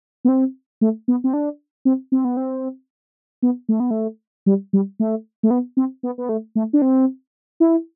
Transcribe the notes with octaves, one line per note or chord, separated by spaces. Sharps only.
B3
C4
A3
B3
C4
D4
C4
C4
B3
C4
B3
A3
B3
A3
G3
G3
A3
A3
B3
C4
B3
B3
A3
A3
D4
C4
E4